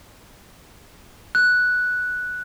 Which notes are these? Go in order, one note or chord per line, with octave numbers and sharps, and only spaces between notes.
F#6